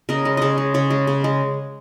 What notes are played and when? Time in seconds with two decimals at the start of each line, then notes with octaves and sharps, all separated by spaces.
0.09 C#3 A#4 D#5
0.25 G#3
0.37 C#3 G#4 C#5 D#5
0.58 G#3
0.74 C#3 G#4 C#5
0.90 G#3
1.07 C#3
1.24 G#3